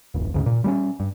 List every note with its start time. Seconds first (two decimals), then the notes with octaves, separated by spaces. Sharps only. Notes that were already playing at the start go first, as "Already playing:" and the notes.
0.14 D1 G#1 F2
0.34 D2 G#2 C#3
0.46 A#2
0.64 G3 G#3 C#4
1.00 G2